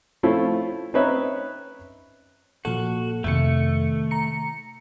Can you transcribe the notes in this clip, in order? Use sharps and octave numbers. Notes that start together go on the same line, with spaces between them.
F3 A3 C4 C#4 E4 F4
C4 C#4 D#4 B4 C#5 E5
A#2 F3 F#4 A4
F2 C3 D#3 A3 C#7
A#5 C#7